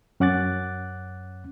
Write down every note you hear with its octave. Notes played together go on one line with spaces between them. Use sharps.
F#2 C#4 F#5 D6 F#6 A6